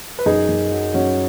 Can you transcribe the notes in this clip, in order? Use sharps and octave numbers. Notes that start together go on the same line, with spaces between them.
B4
F#2 D#4 G#4
F#2
F#3
F#2 C#4 F#4